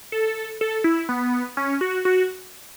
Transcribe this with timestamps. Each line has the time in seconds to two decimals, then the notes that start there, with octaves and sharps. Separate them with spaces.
0.12 A4
0.61 A4
0.84 E4
1.09 B3
1.57 C#4
1.81 F#4
2.05 F#4